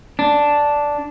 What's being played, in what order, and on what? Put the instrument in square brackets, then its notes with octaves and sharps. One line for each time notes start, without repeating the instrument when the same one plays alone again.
[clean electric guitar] D4